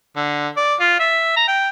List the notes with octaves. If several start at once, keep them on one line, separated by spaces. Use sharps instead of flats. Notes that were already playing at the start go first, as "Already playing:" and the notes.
D3
D5
F4
E5
A#5
G5